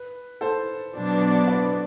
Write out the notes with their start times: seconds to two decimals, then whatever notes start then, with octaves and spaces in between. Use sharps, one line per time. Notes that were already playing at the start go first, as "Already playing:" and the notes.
Already playing: B4
0.41 A4 C5
0.95 B2 F#3 B3 D4
1.48 B4 D5